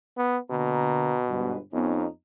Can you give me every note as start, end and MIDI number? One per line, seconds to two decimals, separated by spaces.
0.17 0.38 59
0.51 1.54 47
0.51 1.18 50
0.51 1.18 58
0.51 1.18 82
1.28 1.57 31
1.28 1.57 44
1.28 1.57 71
1.73 2.06 41
1.73 2.06 59
1.73 2.06 61
1.73 2.06 63